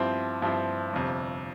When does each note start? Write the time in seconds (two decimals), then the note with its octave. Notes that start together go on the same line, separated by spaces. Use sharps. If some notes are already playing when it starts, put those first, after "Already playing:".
Already playing: G2 F3 C4 E4
0.42 G2 F3 C4 E4
0.93 G1 F2 C3